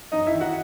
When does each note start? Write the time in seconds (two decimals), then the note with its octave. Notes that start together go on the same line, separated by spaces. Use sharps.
0.12 F#2 D#4 D#5
0.27 E4 E5
0.33 D#3
0.40 F#4 F#5